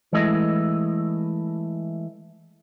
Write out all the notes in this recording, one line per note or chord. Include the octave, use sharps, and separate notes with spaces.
E3 G#3 A3 E4 D#5